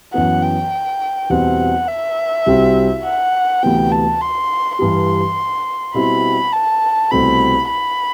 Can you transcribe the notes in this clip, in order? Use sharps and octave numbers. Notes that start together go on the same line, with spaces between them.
F#2 E3 B3 F#5
G5
E2 B2 G3 C4 F#5
E5
C2 C3 G3 C4 F#4
F#5
D2 C3 E3 B3 G5
A5
C6
G2 E3 G3 C6
B2 G3 C4 E4 B5
A5
C2 B2 A3 C4 B5
B5